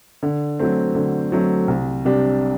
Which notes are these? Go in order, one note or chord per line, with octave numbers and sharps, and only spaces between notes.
D3
F#3 A3 C4
D3
F#3 A3 C4
C2
C3 G3 D4 G4